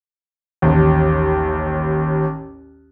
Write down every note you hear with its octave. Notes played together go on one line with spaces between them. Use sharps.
A1 D#2